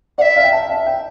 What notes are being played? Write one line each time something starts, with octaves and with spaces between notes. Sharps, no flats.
D5 F#5
E5
F5
G5
A5
E5
G5